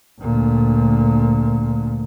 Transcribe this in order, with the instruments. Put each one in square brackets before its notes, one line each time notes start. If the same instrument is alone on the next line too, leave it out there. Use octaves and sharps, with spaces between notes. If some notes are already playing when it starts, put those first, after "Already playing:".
[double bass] D2 A#2